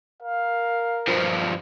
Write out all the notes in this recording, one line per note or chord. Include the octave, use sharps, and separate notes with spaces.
A#4 F5
G2 F3